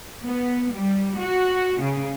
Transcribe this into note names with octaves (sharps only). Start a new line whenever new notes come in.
B3
G3
F#4
C#3